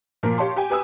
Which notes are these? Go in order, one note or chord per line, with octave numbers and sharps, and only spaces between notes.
A#2 F3 A#4
G4 C#5 F5 A5 C6
G4 G5 G#5
G4 B4 G#5 D#6 E6